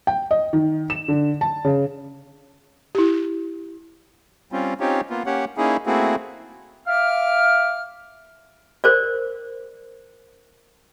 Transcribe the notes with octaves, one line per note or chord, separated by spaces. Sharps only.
G5
D#5
D#3
E7
D3
A5
C#3
E4 G4
G3 C4 C#4 F4
C4 C#4 D#4 F4 G4 C#5
A#3 B3 F4
A#3 C#4 G4 C#5 F#5
A#3 C#4 D#4 E4 G#4
A3 A#3 C4 E4 F#4 G#4
E5 F5 D6 F6
A#4 C5 D5